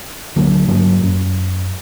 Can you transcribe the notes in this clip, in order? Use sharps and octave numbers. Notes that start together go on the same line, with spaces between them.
D2 D3 F#3 A#3
G2 F#3 A#3
F#2